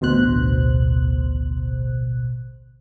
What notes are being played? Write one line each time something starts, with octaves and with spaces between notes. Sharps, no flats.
A1 D2 B2 C5 F#6